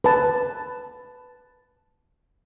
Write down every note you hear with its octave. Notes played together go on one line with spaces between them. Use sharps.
B4 A5